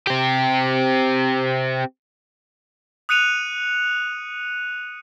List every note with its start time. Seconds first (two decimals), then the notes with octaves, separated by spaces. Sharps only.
0.07 C4 G4
3.09 D#6 F#6 C#7 D#7 F7